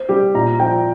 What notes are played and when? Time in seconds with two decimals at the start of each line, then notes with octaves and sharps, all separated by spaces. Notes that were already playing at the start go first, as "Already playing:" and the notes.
Already playing: C5
0.09 G3 G4
0.34 A#2 A#5
0.60 F3 G5